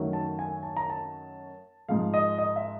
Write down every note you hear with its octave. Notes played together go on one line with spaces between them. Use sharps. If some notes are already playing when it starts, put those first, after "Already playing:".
Already playing: F#2 D#3 F#3 A3
A5
G#5
A5
A#5
A5
G#2 F3 G#3 F5
D#5
D#5
E5